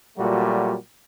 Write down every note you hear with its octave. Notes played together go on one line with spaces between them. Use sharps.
A#2 F#3 G3 A3 F#4